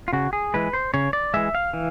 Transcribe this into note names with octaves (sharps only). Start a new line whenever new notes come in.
F4
C#3 F#4
G#4
E3 G#3 B4
C5
C#3 C#5
D5
E3 G#3 E5
F5
E3